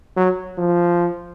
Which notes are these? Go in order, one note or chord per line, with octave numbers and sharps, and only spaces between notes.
F#3
F3